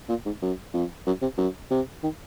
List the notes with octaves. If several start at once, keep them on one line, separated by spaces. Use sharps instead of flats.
A#2
G#2
F#2
F2
F#2
C3
F#2
C3
D#3